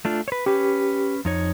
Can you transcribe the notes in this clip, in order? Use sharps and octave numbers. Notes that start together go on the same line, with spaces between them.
A3 D4 F4
B4 C#5
C#4 G4 B4
F2 D#4 C#5